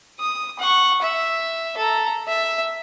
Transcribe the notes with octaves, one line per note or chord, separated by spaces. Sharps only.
D#6
F#5 C#6
E5
A4 A#5
E5